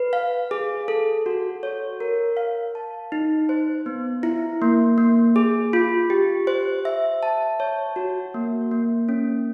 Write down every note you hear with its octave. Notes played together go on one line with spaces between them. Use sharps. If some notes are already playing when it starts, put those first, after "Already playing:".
Already playing: B4
F5
G#4
A4
F#4
C#5
A#4
F5
A5
D#4
C5
B3
E4
A#3
A#3
G#4
F4
G4
C5
E5
A5
C#5
F#4
A#3
A#3
C#4